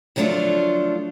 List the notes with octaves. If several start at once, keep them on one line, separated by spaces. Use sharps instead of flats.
D3 F3 F#3 A3 D4 F4